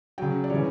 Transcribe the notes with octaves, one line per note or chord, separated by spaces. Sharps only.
C#3 F#3 G5
D5
C#3 E3 G3 C#5